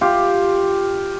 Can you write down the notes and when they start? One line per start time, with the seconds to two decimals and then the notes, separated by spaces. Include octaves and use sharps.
0.01 F4 G4